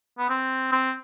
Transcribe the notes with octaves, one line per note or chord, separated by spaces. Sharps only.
B3
C4
C4